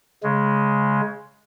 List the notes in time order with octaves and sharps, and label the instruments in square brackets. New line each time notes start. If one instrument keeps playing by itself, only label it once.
[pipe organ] C#3 G#3